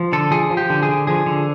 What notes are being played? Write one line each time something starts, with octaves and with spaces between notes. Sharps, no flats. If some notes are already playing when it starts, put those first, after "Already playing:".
Already playing: F3
D3 A4
F3 G#4
F3
G4
D3
G#4
D3
F3 G#4
D3